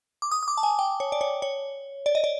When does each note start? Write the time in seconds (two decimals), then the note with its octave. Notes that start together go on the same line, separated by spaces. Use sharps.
0.22 D6
0.31 D#6
0.43 D#6
0.48 D6
0.58 A5
0.63 G#5
0.79 G5
1.00 C#5
1.12 D5
1.21 C#5
1.42 C#5
2.06 D5
2.15 D#5
2.24 D5